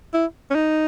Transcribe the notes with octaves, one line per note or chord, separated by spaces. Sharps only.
E4
C#4
D#4